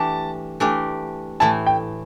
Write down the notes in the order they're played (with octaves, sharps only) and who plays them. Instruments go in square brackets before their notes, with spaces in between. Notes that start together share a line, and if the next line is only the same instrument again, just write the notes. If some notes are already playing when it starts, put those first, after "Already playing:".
Already playing: [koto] E3 A3 D4 G4 [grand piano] A5
[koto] E3 A3 D4 G4
[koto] A2 E3 A3 E4 [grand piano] A5
[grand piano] G5